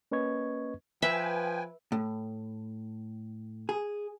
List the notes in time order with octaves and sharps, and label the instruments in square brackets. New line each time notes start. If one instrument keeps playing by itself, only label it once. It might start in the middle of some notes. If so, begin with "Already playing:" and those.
[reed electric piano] A#3 C#4 B4 D#5 C#6 G#6
[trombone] F3 [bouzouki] B4 [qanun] E5 [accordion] G5 G#5
[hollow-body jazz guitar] A2
G#4